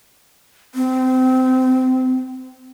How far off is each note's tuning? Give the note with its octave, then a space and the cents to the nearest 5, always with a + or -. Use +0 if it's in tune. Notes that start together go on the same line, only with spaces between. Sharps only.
C4 -25